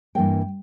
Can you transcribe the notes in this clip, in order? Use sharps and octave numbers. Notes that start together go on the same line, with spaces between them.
G2 E3 A#3 G5